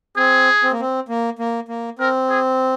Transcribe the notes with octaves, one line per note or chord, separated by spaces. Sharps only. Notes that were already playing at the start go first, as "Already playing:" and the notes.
C4 G#4
C4
A#3
C4
A#3
A#3
A#3
C4 A#4
G#4